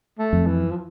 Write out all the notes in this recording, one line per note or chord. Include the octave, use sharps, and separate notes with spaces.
A3
F2
E3
F3